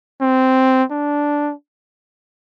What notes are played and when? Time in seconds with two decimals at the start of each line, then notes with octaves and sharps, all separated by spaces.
0.21 C4
0.91 D4